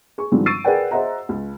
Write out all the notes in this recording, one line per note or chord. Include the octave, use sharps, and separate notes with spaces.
G#4 C#6
G2 D3 D#3 F3 G#3 C4
C#6 E6 A6 C7 D7 D#7
G#4 A#4 B4 D5 F#5 G5
G#4 C5 D#5 E5 F#5 A#5
C#2